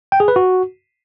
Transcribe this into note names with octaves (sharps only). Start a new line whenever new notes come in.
G5
G#4
B4
F#4